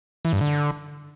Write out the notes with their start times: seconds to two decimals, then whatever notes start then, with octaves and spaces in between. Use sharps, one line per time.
0.25 E3
0.33 G2
0.41 D3